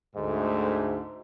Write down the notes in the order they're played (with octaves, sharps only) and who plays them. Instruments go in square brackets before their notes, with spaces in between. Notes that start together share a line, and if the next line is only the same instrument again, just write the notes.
[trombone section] D2 G#2